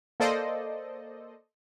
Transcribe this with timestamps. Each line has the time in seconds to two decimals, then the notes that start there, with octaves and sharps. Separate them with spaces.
0.20 A#3 A4 C5 D5 D#5